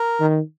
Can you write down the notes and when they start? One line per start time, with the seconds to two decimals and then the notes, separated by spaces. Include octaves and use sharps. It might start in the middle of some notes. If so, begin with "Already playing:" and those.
Already playing: A#4
0.20 D#3